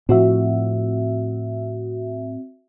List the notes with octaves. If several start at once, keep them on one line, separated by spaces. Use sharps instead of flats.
A2 F3 C4 F#4 E5